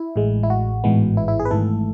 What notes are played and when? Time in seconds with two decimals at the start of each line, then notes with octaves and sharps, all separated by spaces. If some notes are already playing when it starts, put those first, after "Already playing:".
Already playing: E4
0.16 A1 A2 G#3
0.43 E4
0.50 F#4
0.84 A1 G#2 E3 G#3 B3
1.17 E4
1.28 E4
1.40 G#4
1.45 B4
1.51 G#1 G#2 E3 A3 A4